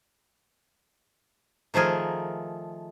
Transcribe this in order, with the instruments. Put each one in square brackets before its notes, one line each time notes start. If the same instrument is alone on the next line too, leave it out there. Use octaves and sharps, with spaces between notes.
[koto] D#3 F3 A3 G#4 A#4